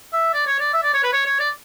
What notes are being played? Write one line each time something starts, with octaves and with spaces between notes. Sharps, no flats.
E5
D5
C#5
D5
E5
D5
C#5
B4
C#5
C#5
D5